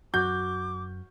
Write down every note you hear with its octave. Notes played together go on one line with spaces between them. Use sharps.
F#2 F#3 F#4 D6 G6